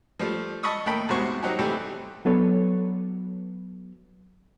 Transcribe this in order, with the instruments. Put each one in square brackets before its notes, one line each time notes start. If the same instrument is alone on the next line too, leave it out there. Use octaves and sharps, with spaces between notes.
[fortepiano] F3 G3 A3
D#5 A5 B5 C#6 D#6 E6
D#2 A2 A4 A#4 G5 B5
E2 G#2 C3 F#4 C5 C#6
F#3 C4 D#4 F#4 G4
C3 E3 G3 A3 C4 G4
[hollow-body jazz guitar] F#3 B3 D4 A4 B4 C#5